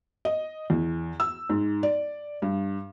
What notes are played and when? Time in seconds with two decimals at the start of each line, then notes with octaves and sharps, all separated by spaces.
0.25 D#5
0.70 E2
1.20 E6
1.49 G#2
1.83 D5
2.42 G2